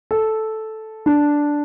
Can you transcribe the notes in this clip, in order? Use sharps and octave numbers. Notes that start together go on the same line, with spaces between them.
A4
D4